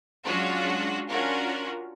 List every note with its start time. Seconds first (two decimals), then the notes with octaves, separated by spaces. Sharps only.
0.25 F#3 G#3 C#4 D4 F4 F#4
1.09 C#4 D4 F4 F#4 A#4